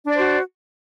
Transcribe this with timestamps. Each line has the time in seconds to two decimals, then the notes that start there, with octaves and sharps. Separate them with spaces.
0.05 D4
0.09 D5
0.14 C5
0.19 F#4